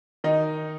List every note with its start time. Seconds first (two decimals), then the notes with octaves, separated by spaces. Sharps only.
0.24 D#3 D#4